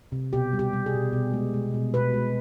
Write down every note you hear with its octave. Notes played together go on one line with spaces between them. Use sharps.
C3
B2 G4
G3
G4
G3
G#4
B2
B2
G#3
G#3
B2
B2 B4
G#3